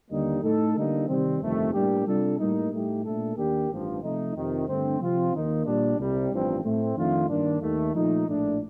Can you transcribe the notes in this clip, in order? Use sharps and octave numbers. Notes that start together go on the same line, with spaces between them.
D#2 D3 G3 A#3 D#4
A2 A3 D#4 A4
D3 G3 A#3 D#4
C3 D#3 G3 C4
G1 F2 C3 D#3 A3
A2 G3 A#3 D4 G4
C3 G3 D4 F4 A4
A2 G3 A#3 D#4
A2 A3 D#4 G4
A#2 A3 D4 A4
D#2 D#3 A#3 D4 G4
A1 G2 F3
C3 F3 A3 D#4
F2 C3 D#3
G2 D3 A3 C4
C3 F3 C4 F4
D#2 D#3 A#3 D#4
A#2 G3 D4
C2 C3 G3
A1 G2 F3 C4
A2 A3 C4
F2 D#3 A3 D4 F4
G2 D#3 A#3 D4
D#2 D#3 A3
A#2 F3 A3 D#4
A#1 A2 A3 D4